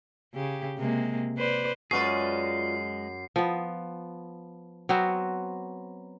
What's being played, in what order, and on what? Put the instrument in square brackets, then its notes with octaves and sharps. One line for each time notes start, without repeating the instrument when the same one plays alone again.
[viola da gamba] C#3 G4
C3 G#3 A#3
B4 C5 D5
[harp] F#2 C#6 [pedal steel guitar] G#3 G#4 [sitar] F4 B4 D5 [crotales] C7
[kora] F3 B3
F#3 B3 C4 F#4